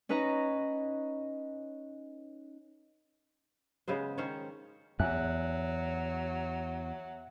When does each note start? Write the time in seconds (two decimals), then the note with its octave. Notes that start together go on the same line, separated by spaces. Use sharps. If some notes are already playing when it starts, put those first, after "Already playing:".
0.09 C#4 D#4 B4 D#5 A#5
3.88 C#3 G#3 B3 C5
4.18 D#3 C#4 C5 C#5
5.00 E2 F#3 E5 F#6